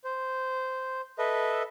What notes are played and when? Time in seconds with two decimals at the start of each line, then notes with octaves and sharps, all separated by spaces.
0.04 C5
1.19 A4 B4 D#5 E5